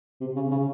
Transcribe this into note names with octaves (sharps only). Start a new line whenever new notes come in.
C3
C#3
C#3